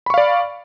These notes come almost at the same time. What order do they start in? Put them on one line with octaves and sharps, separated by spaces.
B5 C#6 F5 D5